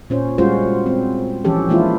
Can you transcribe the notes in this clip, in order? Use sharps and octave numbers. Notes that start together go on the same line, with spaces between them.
A#2 C#4 C5
G3 G#3 C#4 F4 F#4 C5
C4
E3 F3 C#4 G4 A4
E3 G#3 A#3 D4 E4 F4